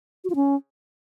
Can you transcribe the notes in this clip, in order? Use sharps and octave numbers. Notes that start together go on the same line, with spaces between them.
F#4
F4
C#4